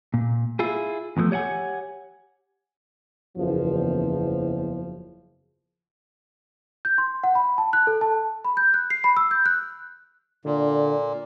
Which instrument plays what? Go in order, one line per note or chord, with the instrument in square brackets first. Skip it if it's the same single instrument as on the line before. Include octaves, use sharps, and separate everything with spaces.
[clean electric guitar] A#2
E4 F4 G#4
E2 A2 D3 F3 A3
G4 C#5 D#5 F#5 G#5
[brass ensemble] F#1 E2 F3
[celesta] G6
C6
F#5
B5
A5
F#6
A4
A5
B5
G6
F#6
C7
B5
E6
G6
F#6
[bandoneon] A#2 [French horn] D3